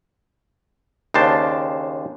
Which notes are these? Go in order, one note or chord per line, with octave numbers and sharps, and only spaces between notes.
D#2 C#3 D4 C5 A5